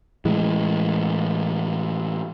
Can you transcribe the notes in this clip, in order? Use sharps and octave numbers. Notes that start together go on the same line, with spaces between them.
A2 E3 G#3